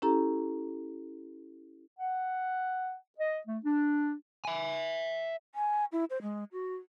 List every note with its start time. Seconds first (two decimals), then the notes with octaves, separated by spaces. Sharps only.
0.02 C#4 E4 G4 A4 A#5
1.99 F#5
3.19 D#5
3.46 A3
3.64 D4
4.45 E5 G#5
5.55 G#5
5.92 E4
6.10 C5
6.22 G#3
6.52 F#4